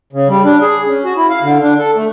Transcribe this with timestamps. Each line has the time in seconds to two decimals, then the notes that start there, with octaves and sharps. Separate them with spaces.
0.13 C#3
0.28 G3
0.44 D4
0.61 G#4
0.87 C#4
1.04 F#4
1.17 E4
1.30 F5
1.42 D3
1.62 D4
1.79 A4
1.96 A3